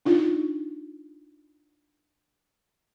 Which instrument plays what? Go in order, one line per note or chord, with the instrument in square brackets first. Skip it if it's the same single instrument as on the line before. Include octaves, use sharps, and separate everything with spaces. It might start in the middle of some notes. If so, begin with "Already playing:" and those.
[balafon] D4 D#4 F4